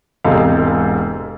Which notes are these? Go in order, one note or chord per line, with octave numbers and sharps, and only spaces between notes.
E1 G#2 C3 D#4 A4 F5